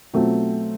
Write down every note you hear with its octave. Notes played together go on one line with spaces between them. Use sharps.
B2 F#3 A3 C4 F4